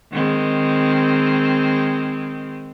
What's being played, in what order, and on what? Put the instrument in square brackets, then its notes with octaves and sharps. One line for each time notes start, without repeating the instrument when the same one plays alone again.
[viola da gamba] D#3 G#3 C4